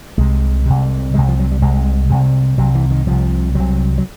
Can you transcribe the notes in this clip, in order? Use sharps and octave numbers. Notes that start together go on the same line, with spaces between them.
C2 C3 G#3
C2 C3
C2 C3 G#3
F3
F#3
G3
C2 C3 G#3
C2 C3
C2 C3 F#3
E3
D#3
C2 C3 F3
C2 C3 F#3
F#3